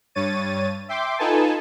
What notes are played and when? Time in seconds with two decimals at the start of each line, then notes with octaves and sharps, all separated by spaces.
0.15 G2 C#5 A6 D#7
0.89 E5 G5 C6 D6
1.18 D#4 F4 A4 B4 G#5 A5